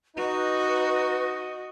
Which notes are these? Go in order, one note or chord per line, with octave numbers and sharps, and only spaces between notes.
D#4 F#4 B4 D#5